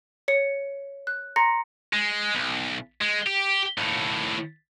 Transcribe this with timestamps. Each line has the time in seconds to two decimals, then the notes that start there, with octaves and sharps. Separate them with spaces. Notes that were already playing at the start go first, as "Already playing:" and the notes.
0.28 C#5 C#7
1.07 F#6
1.36 A#5 C6 A#6 C#7
1.93 G#3
2.36 B1
3.01 G#3
3.27 G4
3.78 D#2 A2